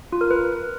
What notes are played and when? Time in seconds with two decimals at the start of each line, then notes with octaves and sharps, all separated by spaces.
0.13 F4
0.21 A#4
0.31 B4